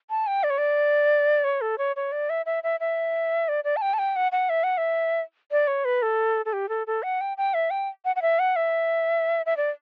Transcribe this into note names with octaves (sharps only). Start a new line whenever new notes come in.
A5
G5
D5
C#5
D5
C#5
A4
C#5
C#5
D5
E5
E5
E5
E5
D5
D5
A5
G5
A5
G5
F#5
F#5
E5
F#5
E5
D5
C#5
B4
A4
A4
G4
A4
A4
F#5
G5
G5
E5
G5
F#5
F#5
E5
F#5
E5
E5
D5